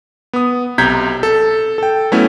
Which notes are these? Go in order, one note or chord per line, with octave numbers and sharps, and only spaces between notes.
B3 D#6
B1 C3 A#5 G6 G#6 B6
A4
A4 G5
F#3 A3 B3 C#4 E4